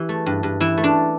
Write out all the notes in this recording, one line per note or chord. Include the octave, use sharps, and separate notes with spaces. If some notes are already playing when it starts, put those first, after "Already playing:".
Already playing: E3 G4
A3
G2
G2
E3 E4
A3
D4